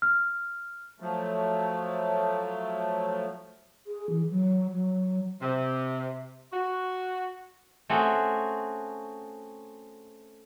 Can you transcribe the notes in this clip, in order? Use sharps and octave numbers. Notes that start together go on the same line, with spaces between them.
F6
F3 F#3 A3
G#4
E3
F#3
F#3
C3
F#4
A3 C4 C#4 F#4 G#4